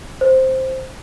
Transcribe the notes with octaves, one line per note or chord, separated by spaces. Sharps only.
C5